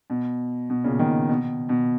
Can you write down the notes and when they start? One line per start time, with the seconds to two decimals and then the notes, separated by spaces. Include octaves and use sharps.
0.10 B2
0.70 B2
0.84 A#2 C#3
0.99 B2 D#3
1.29 B2
1.69 B2